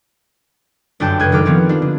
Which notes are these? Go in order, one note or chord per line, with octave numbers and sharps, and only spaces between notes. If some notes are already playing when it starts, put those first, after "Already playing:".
G1 F#2 D4 G5 A5 G6
C#2 D4 A4 F#6 G#6 D#7
D#3 F#3 A4 D6 F6
D#3 F3 B3 C4 G4
D4 F4
D3